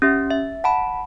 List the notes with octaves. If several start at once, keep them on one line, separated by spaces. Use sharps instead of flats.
C#4 G4 E5
E5
F#5 A5 B5